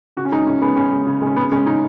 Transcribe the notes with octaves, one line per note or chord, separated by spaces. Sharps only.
C#3 F#4
C#4
G#3 D#4
C#3 C#4
G#3 B3
C#3 C#4
G#3
C#3
G#3 C#4
C#3 B3
G#3 C#4
C#3 D#4